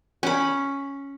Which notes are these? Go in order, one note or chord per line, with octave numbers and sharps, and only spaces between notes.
C#4 B5